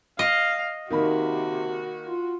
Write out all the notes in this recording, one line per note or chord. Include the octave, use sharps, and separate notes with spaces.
D#5 F5
C3 D#3 A#3 F#4 B5
F4